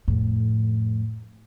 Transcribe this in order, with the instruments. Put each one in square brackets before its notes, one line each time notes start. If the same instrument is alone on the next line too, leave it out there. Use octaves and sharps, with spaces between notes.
[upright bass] F2 A2